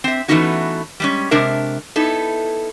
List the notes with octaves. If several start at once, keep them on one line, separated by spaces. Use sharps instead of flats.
C4 E5
E3 A3 B3 C#4 D#4 F#4
G3 G#3 C#4
C3 G#3 D4 A#4 E5
B3 D#4 E4 A4